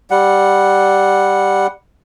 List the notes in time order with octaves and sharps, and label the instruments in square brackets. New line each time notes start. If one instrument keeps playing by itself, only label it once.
[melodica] G3 F#5